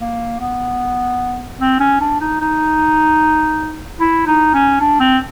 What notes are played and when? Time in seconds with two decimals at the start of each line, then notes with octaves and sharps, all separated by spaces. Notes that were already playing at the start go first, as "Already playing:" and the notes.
0.01 A#3
0.40 B3
1.61 C4
1.80 C#4
2.01 D4
2.21 D#4
2.41 D#4
4.00 E4
4.27 D#4
4.54 C#4
4.81 D4
5.00 C4